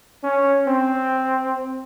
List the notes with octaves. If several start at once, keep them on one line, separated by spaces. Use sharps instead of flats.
C#4
C4